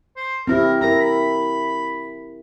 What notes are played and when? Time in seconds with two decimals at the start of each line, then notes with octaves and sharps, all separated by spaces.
0.16 C5
0.47 C4 E4 G4 A#4
0.81 E4 A#4 A#5
1.00 B5